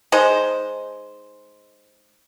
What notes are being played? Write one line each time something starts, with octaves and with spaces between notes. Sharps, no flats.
G#3 D#4 C5